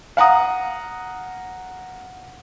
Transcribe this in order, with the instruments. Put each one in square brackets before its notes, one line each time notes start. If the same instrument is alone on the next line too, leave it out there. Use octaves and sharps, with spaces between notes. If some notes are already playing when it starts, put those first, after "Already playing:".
[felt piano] F5 F#5 A#5 D#6